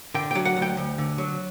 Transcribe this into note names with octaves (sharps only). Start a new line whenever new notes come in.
D3 G5
F#3 G5
F#5
D2
G5
D2
D3
F#3